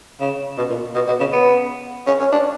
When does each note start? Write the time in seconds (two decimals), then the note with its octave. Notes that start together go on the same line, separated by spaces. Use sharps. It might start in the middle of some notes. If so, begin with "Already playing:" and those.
0.20 C#3
0.57 B2
0.70 A#2
0.95 B2
1.07 B2
1.20 C#3
1.32 B3
2.06 C#4
2.20 C#4
2.32 D4